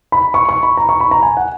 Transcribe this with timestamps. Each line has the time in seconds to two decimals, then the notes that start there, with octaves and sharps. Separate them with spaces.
0.12 B5
0.34 C#6
0.49 C#6
0.63 B5
0.77 A#5
0.89 C#6
1.00 B5
1.11 A#5
1.23 G#5
1.37 F#5